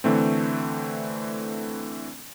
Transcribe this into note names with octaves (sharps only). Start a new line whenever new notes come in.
D3 E3 A3 C4